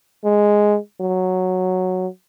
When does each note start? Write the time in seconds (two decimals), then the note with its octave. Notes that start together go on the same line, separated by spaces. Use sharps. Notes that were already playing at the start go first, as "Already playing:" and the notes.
0.24 G#3
1.00 F#3